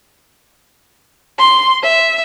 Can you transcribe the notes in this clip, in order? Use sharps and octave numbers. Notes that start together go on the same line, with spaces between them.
C6
E5